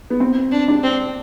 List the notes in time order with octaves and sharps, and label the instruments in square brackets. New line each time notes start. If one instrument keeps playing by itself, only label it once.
[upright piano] B3
C4
[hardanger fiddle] D4
[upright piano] D4
[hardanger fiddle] C4